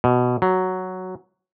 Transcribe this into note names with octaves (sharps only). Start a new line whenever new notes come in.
B2
F#3